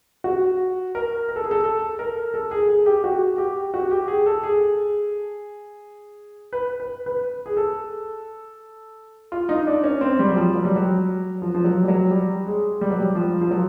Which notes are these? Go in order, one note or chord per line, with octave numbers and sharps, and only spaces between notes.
F#4
A#4
A#4
A4
G#4
A4
A4
A#4
A4
G#4
G#4
G4
F#4
G4
F#4
G4
G#4
A4
G#4
B4
B4
B4
G#4
A4
F4
D#4
D4
C#4
C4
G3
F#3
F3
F#3
G3
F#3
F3
F3
F#3
G3
F#3
G3
G#3
G3
F#3
G3
F3
F3
F#3